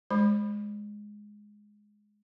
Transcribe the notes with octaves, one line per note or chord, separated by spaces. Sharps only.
G#3 C5 B5